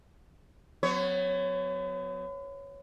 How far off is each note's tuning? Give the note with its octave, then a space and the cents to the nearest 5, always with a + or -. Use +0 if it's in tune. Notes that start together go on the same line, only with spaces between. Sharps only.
F#3 -25 B3 +40 C#5 +0